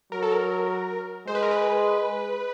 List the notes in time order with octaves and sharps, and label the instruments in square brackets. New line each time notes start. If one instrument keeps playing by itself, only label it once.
[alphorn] F#3 [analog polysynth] A#4
[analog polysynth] A4
A#4
[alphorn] G#3 [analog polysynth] C5
[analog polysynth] B4
A#4
B4